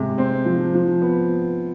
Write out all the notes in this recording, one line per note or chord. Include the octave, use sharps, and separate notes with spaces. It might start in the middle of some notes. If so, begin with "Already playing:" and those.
Already playing: C3 G#3
C4
F3
F3
B3